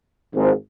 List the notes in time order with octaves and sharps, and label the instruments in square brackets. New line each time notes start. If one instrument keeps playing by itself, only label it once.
[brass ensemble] G#1 G#2 F3